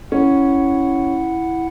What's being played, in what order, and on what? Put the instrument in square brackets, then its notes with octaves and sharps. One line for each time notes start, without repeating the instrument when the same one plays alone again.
[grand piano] C#4 [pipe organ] E4 F#5